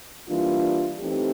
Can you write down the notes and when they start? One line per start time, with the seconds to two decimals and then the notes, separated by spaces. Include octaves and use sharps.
0.27 E3 G3 A#3 D4 F4
1.00 E3 A3 C4 D#4 G4